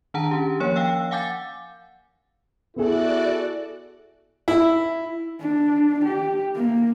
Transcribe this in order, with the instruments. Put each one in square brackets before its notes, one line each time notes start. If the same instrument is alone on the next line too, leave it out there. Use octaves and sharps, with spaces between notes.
[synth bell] D#3 D4 F#5 A5 A#5
C#4 G4
F3 A#3 C#5 C#7
F5 G5 E6
F5 F#5 G#5 D6 G6 A6
[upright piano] B3 G#4 [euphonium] E4 [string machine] F#4 D5 F#5 [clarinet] A4
[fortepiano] E4
[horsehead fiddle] D4
G4
A#3